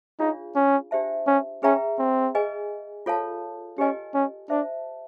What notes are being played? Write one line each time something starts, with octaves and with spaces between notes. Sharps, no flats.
D4 D#4 F4 G#4 C#5 F5
C#4
D4 G4 C5 E5 A5
C#4
C#4 G#4 B4 E5 G5 A#5
C4
G#4 B4 D#5 G#5
F4 A4 C#5 F5 A5
C#4 G4 B4 D#5 G#5
C#4
D4 C5 E5 A5